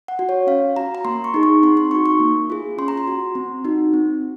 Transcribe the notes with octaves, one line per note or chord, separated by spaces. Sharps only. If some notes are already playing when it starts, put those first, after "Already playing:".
F#5
F#4
C#5
C#4 F5
F#4 A#5
A#5
A#3 C6
C#6
D#4 G#4
C#6
C4 C6
C6
D#4 F#4 C#6
C#6
A#3
F4 G#4
C#4 C6
A#5
C6
F#4
C4
D#4 F#4
C4